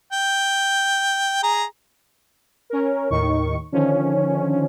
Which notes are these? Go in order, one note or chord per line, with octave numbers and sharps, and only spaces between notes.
G5
G#4 A#5
C#4 A#4
D#2 A2 D#3 C#6
D3 D#3 F3 C#4